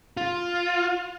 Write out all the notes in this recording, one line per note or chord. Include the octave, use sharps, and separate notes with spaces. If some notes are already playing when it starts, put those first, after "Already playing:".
F4